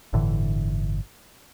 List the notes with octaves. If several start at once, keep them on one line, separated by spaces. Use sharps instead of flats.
G1 A2 D3 E3